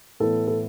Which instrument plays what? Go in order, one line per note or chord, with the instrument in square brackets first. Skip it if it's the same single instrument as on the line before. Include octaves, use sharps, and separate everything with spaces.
[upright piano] A2 E3 B3 A4
A4